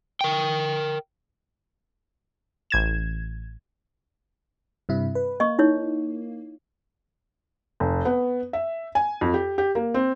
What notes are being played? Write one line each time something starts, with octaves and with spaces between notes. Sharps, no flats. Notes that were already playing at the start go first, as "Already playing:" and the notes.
A#4 G5
A1 G#6 E7
G2 C3 E4
B4
A#3 D#5 C#6
D#4 E4 C#5
F1
B3
E5
G#5
F2
G4
G4
A#3
C4